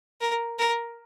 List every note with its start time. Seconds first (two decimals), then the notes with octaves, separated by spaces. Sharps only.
0.21 A#4
0.59 A#4